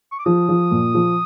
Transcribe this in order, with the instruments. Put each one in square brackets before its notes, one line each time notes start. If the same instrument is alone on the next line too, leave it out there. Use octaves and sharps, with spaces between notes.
[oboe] C#6
D6
[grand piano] F3 [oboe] D#6
[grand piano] F3
A#2
F3